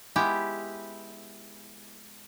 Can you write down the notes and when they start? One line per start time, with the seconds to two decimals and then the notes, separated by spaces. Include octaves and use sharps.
0.16 G#3 B3 E4 G4